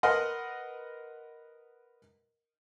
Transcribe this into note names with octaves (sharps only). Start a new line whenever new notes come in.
A#4 B4 D#5 F#5 C6 F6